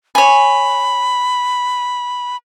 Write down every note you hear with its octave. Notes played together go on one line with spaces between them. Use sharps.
C#5 G#5 B5